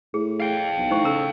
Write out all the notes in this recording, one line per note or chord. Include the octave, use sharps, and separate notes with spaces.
A2 G#4
F5 G5
B1
A2 D#4 C5 C#6
C#3 A4 A#5 E6